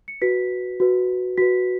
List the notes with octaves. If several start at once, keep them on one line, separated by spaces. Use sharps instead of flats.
C#7
F#4 B4 B6
F#4 B4
F#4 B4 B6